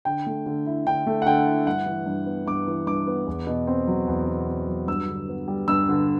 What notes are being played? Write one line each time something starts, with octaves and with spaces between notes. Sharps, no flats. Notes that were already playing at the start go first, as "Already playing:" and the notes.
D3 G5
A3
D3
E4
D3 G5
A3
F#5
D3 G5
E4
G2 F#5
E3
G2
B3
G2 D6
E3
G2 D6
B3
E2
B2
C4
F#3
E2
B2
C4
F#3
G2 E6
D3
B3
G3
G2 E6
D3